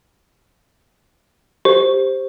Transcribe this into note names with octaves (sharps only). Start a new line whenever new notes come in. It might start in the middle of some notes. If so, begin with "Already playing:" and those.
G4 C5